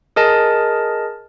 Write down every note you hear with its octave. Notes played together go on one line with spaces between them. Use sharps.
G#4 A#4 D#5 A5